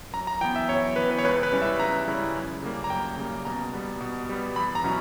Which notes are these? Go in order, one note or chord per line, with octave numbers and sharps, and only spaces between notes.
F#2 A#5
A#5
E3 B3 G5
E5
F#2 C#5
E3 B3 B4
B4
C#5
C#2 B4
B4
C#3 G3 C#4 E4
E5
C#2 A#5
C#3 G3 C#4 E4
F#2
C#3 G3 A#3
A#5
F#2 G5
C#3 G3 A#3
B2 A#5
G3 B3
B2
G3 B3
E2 B5
A#5
B2 F#3 C#4 E4